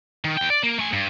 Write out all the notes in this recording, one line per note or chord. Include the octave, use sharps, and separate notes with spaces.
D#3
D#2 G5
D5
A#3
A3 G#5
G2